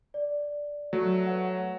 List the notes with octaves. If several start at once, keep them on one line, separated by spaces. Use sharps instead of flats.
D5
F#3 A3
B4 C#5 F#5